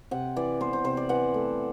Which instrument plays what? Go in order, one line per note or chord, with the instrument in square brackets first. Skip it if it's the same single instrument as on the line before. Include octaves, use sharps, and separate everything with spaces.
[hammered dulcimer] C3 F#5
E3 D5
B3 C5
C5
C3 C5
D5
E3 F#5
A3